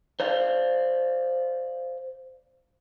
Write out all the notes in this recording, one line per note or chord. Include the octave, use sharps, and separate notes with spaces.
C5 D5 F5